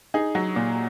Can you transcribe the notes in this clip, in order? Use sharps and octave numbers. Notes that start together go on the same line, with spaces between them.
D#4 G#4
F#3
A#2